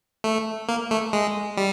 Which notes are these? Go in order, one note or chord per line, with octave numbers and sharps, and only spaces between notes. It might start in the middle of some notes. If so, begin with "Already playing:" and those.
A3
A#3
A3
G#3
G3